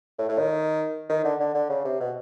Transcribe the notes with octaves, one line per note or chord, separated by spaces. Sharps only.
A2
A2
D#3
D#3
D3
D3
D3
C#3
C3
B2